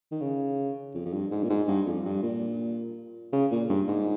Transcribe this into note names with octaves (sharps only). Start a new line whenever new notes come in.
D#3
C#3
F2
F2
G2
G#2
A#2
G#2
G2
F2
G2
A#2
C#3
A#2
G2
G#2